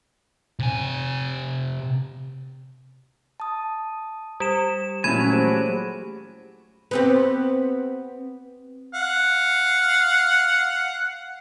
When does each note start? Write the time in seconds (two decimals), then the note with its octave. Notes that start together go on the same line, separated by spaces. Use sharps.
0.59 C3 G#5
3.40 A5 D#6
4.40 G3 G4 E7
5.04 A#2 E3 F#3 A3 C#4 G#5 B5
5.31 G4 G#4 C5
6.91 B3 C4 G4
8.94 F5 F#5